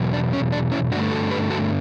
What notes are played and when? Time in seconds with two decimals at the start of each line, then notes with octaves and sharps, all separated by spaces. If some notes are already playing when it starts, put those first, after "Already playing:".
Already playing: E2 B2 F#3
0.13 D4
0.33 C#4
0.52 D4
0.72 C#4 E4
0.91 G2 D3 A3 D4 F#4
1.11 F#4 A4
1.31 G4 B4
1.50 F#4 A4